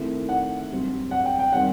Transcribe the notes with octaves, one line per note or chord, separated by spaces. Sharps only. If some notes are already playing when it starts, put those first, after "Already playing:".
Already playing: D#3 A3 C4 E4
F#5
G2 F#3 C4
F#5
G5
G5
D#3 G3 C4 D#4 F#5